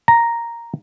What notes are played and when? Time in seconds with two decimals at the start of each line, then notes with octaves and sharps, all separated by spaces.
0.08 A#5